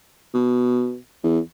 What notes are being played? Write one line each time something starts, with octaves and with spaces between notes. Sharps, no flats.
B2
E2